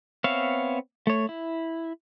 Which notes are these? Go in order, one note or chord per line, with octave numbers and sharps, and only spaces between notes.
B3 C4 C#5 E5 F5
A3 C#5
E4